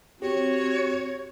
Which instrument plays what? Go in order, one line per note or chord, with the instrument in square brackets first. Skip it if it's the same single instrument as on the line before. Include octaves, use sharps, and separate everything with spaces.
[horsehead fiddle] C4 [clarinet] F#4 [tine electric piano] G4 [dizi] C#5